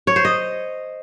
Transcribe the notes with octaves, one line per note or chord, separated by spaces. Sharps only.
C#5
C5
D#5